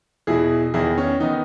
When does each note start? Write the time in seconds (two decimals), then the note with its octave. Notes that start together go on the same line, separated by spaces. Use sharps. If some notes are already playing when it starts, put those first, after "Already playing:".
0.27 E2 B2 E4 G#4
0.74 E2 D#3 E4 G#4
0.98 C#4
1.20 D#3 B3 D#4